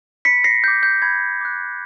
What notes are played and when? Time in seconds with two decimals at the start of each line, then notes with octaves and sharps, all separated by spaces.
0.25 B5 B6 C#7
0.44 A#6 C7
0.64 D6 F#6 G6
0.83 G6
1.02 B5 G#6
1.41 D6 F#6